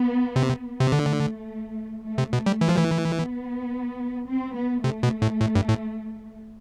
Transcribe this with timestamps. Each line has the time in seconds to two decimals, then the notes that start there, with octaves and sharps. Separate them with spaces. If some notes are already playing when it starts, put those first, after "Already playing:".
Already playing: B3
0.36 C3
0.80 C3
0.92 D3 A3
2.05 A3
2.18 C3
2.33 B2 A3
2.46 G3
2.61 E3
2.69 F3
2.77 E3
3.17 B3
4.29 C4
4.57 B3
4.84 C3 A3
5.03 B2
5.22 A2
5.41 A2
5.55 G2
5.69 A2